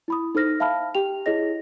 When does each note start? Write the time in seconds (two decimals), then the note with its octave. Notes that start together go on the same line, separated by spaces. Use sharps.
0.08 E4 B5 D#6
0.35 D#4 A4 C5 F6 A#6
0.60 E5 F5 A5 B5 F6
0.95 G4 G5 F7
1.26 E4 G#4 C#5 D#5 A#6